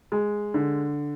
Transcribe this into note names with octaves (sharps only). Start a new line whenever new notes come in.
G#3
D3